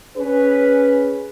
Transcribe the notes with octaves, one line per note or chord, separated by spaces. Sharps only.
C#4 G#4 B4